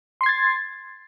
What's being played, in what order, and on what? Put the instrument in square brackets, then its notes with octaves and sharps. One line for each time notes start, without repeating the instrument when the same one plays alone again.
[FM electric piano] C6
C7
G#6
A6